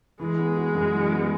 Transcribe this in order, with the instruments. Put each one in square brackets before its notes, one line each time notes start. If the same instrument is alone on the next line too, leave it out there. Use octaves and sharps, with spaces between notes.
[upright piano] E3 [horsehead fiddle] G#3
[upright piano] B3
F#4
F#2
E3
B3